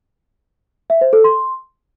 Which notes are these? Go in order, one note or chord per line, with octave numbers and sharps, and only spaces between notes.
E5
C5
A4
C6